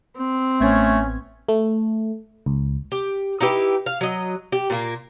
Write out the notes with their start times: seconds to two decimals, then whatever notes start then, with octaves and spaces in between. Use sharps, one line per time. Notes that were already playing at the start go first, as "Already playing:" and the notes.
0.16 C4
0.61 A1 A3 B3 C#4 G#6
1.49 A3
2.46 C#2
2.92 G4
3.41 D#4 E4 G4 B4
3.86 F5
4.01 F#3 D#5
4.52 G4
4.70 A#2 A#3